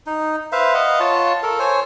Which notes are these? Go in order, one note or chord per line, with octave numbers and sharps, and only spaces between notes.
D#4
B4 C5 E5 F5
D#5 F5 F#5
F4 C#5 A5
A4 A#4
C5 C#5 G#5